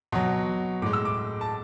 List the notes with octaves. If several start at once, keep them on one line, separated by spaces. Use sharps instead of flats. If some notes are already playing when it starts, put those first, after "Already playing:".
B2 F#3
A2 G#3 D6
E6
D6
A5